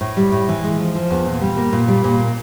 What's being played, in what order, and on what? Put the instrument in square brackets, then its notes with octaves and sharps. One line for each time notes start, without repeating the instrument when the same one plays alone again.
[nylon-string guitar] A2
G3
A2
E3
G#3
F3
F3
E2
A#2
G3
A#3
A#2
G3
A#2
A#3